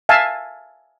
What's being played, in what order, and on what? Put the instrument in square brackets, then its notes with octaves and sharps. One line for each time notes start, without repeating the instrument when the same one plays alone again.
[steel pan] E5 F5 G#5 A5